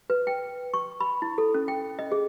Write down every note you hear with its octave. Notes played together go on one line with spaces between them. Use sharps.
B4
G5
C#6
B5
E4
A4
C#4
G5
D#5
G#4